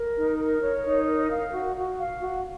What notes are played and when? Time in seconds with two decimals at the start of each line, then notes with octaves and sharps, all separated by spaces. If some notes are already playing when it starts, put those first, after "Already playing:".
Already playing: A#4
0.15 D#4
0.38 A#4
0.61 C#5
0.84 D#4
1.08 A#4
1.29 F5
1.52 F#4
1.77 F#4
1.99 F5
2.22 F#4